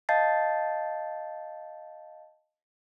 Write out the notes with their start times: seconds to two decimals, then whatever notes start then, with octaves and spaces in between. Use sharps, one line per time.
0.09 D#5 F5 A5 G6 A6 C7